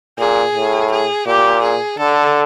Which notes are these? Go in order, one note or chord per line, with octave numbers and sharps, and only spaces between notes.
A#2 G#4
A2
G#4
A#2 G4
G#4
D3 A4